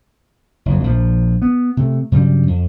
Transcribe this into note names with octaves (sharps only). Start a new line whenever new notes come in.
F#1 F2
A#1 F3
B3
C3 A3
G2 C#3 F#3 G3
F2